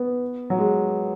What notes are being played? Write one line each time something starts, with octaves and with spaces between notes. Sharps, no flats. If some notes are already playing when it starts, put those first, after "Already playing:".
Already playing: B3
F#3
G#3